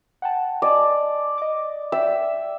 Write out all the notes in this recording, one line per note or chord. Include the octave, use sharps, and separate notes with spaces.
F#5 G5 A5
D5 D#5 G#5 A5
D#5 D6
D5 E5 G5